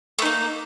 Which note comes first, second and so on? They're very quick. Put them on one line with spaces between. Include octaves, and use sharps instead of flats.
A3 D#4 A#3